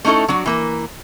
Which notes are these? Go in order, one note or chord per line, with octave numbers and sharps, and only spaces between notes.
A3 C#4 D#4 E4 A4
F#3 D4 F#4
E3 A#3 A#4